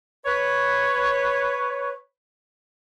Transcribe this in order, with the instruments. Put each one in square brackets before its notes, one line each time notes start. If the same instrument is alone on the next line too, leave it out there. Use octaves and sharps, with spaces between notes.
[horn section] B4 C#5